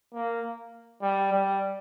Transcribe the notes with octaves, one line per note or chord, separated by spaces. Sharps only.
A#3
G3
G3